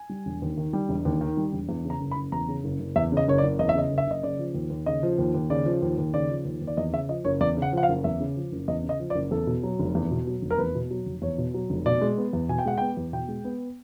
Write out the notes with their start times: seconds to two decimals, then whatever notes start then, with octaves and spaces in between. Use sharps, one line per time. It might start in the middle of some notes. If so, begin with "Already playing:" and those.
Already playing: G#5
0.10 G3
0.26 E1
0.42 D#2
0.57 D#3
0.73 G3
0.89 E1
1.05 D#2
1.21 D#3
1.37 G3
1.53 E1
1.69 E2
1.85 C#3
1.90 A#5
2.01 F#1
2.11 B5
2.16 F#1
2.32 E2 A#5
2.48 C#3
2.64 F#1
2.80 F#1
2.96 E2 E5
3.12 C#3
3.17 D#5
3.28 F#1 C#5
3.38 D5
3.43 F#1
3.59 E2 D#5
3.69 E5
3.75 C#3 D#5
3.91 F#1
3.98 E5
4.08 F#1 D#5
4.23 C#3 D5
4.39 F3
4.54 D#2
4.70 D#2
4.86 C#3 D#5
5.03 F3
5.18 D#2
5.34 D#2
5.50 C#3 D5
5.66 F3
5.82 D#2
5.98 D#2
6.14 C#3 D5
6.30 F3
6.45 D#2
6.61 D#2
6.67 D5
6.77 E2 D#5
6.93 C#3 E5
7.09 F3 D#5
7.25 F#1 C#5
7.41 E2 D5
7.57 C#3
7.62 F#5
7.72 F3 F#5
7.83 F5
7.89 F#1
8.04 E2 E5
8.20 C#3
8.36 F3
8.52 F#1
8.68 E2 D#5
8.84 C#3
8.89 D#5
9.00 F3
9.10 D5
9.15 F#1
9.31 E2 A4
9.47 B2
9.63 F#3
9.79 F1
9.95 E2
10.11 B2
10.27 F#3
10.42 F1
10.51 A#4
10.58 E2 B4
10.75 B2
10.91 F#3
11.06 F1
11.22 E2 C#5
11.38 B2
11.54 F#3
11.70 F1
11.86 B2 D5
12.01 G#3
12.18 B3
12.33 E2
12.49 B2 G#5
12.59 G5
12.65 G#3 F#5
12.78 B3 G5
12.97 E2
13.13 B2 G5
13.28 G#3
13.45 B3